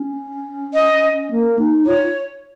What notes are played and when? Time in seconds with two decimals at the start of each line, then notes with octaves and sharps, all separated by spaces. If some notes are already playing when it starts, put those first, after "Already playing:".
Already playing: C#4
0.74 D#5
1.30 A#3
1.59 D#4
1.86 F4 C#5